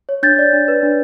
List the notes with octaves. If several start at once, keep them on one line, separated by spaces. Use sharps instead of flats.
C#5
D4 G6 A6
D5
D4
B4
D4